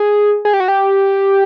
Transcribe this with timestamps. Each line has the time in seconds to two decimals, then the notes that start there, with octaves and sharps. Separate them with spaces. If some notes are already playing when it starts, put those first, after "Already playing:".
Already playing: G#4
0.45 G#4
0.53 G4
0.60 F#4
0.68 G4